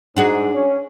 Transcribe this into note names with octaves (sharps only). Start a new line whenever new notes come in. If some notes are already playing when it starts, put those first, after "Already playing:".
G#2 D4 F#4 G#4
C#4